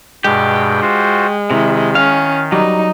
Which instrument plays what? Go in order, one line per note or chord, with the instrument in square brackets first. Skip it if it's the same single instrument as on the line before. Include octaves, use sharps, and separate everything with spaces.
[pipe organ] G2 B2 G5 [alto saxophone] G#3 [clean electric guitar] G4
[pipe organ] F4 F#4 C5
[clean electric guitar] C3 [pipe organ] D#3 [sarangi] E4
[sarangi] C#4 [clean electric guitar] F5
[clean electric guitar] F#3 [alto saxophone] G3 [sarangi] D#4